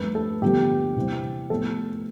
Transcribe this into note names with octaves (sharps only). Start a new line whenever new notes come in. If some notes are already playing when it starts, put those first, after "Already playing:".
Already playing: G2 F3 A3 C4 B4
A4
G2 D3 F3 B3 G4
C3 E3 G3 C4
A2 F3 B3 A4